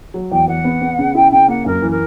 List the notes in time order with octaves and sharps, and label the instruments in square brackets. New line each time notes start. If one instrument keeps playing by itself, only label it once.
[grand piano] F#3
[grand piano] E2 [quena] G5
[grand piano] E2 [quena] F#5
[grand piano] B3
B3
C#3
[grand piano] E4 [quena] G5
[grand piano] C#3 [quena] G5
[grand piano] A#3 [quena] F#5
[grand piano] F#2 [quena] A#4
[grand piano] E3
[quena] A#4